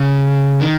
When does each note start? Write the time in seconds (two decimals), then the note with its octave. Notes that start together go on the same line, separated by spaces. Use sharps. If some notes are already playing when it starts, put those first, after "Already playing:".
Already playing: C#3
0.61 D#3